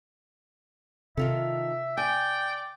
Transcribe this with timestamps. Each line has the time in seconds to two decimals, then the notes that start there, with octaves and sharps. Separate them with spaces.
1.17 C3 D#3 F4 A4 E5
1.97 D5 G5 G#5